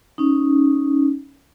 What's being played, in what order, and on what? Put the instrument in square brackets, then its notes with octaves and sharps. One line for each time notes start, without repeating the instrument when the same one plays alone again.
[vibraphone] C#4 D#4